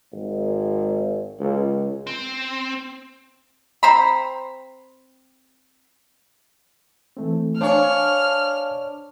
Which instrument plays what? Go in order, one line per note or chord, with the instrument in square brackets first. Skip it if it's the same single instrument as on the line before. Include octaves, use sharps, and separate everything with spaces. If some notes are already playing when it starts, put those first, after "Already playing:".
[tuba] G#1
C#2
[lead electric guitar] C4
[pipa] C4 C5 A#5 B5
[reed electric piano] E3 A3 C4
[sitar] D4 C#5 [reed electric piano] C5 F5 G#5 [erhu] F6